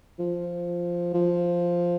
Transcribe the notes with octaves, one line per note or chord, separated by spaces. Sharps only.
F3
F3